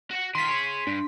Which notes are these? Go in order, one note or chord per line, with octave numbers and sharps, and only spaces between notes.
F#4 F#5
D#3 F4 C6 B6
G#4 C#5
G2 D4